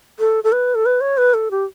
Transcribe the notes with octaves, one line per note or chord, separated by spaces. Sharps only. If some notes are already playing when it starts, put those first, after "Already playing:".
A4
A4
B4
A4
B4
C#5
B4
A4
G4